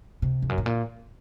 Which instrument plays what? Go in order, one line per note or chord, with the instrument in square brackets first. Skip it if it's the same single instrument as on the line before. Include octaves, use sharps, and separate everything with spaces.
[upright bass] C3
F2
F#2
A2
A#2